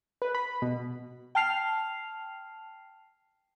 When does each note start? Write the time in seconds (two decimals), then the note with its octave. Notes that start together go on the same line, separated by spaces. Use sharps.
0.22 B4
0.35 B5
0.62 B2
1.35 G5 A5 F6 C7 F7